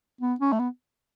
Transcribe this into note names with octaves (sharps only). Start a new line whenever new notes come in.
B3
C#4
A3
B3